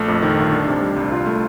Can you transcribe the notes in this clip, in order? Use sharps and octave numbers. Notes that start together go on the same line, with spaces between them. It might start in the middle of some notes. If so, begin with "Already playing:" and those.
Already playing: A#1 A3
F2
D#3
G1
D4
C3
G3
C2
F4
A3